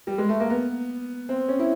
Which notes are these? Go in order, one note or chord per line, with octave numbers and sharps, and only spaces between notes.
G3
G#3
A3
A#3
B3
C4
C#4
E4